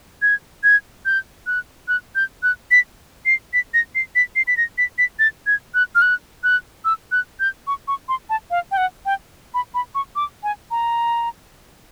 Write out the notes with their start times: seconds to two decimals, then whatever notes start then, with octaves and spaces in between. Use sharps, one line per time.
0.22 G#6
0.64 G#6
1.06 G6
1.47 F#6
1.88 F#6
2.15 G6
2.43 F#6
2.71 B6
3.26 C7
3.53 B6
3.74 A#6
3.95 C7
4.16 B6
4.36 C7
4.48 B6
4.57 A#6
4.78 B6
4.98 B6
5.19 A6
5.47 G#6
5.74 F#6
5.95 F6
6.02 F#6
6.44 F#6
6.85 E6
7.12 F#6
7.40 G6
7.67 C#6
7.88 C#6
8.09 C6
8.30 A5
8.51 F5
8.71 G5
8.77 F#5
9.06 G5
9.54 B5
9.74 B5
9.95 C#6
10.16 D6
10.43 G#5
10.71 A#5